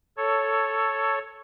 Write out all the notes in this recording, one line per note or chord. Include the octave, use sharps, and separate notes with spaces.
A4 C#5